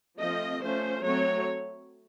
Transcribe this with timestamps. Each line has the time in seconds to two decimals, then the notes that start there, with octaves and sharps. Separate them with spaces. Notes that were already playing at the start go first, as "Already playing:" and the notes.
0.19 F3 A3 C4 D#5
0.61 F3 A3 C#4 C5
1.04 F#3 A3 C4 C#5